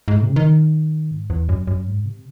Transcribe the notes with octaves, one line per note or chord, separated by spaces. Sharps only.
G#2
A2
C3
C#3
D#3
G#2
E2
F#2
F#2
G#2
C3